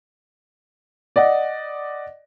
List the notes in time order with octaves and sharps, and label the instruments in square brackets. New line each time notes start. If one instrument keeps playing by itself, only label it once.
[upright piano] D5 D#5 F#5